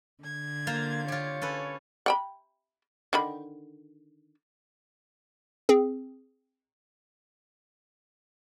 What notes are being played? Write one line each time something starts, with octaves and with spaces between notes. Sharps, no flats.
D3 G#6
A#3 F4 C5 A#5
F4 G4 C#5
C#4 A4 B4
F#5 G5 B5
D3 D#3 B5
C4 G#4